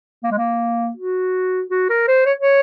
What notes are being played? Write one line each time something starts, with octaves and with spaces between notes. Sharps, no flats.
A#3
G#3
A#3
F#4
F#4
A#4
C5
C#5
C#5